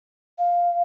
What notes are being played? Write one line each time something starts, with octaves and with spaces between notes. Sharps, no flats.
F5